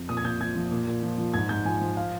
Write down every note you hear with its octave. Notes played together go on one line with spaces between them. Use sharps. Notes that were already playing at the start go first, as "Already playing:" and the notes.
Already playing: F2
A#2 D#6
G#6
A#2 G6
F3 G#6
F3
A#2
A#2
F3
F3
G#2 G#6
G#2 G6
F3 G#5
F3
F5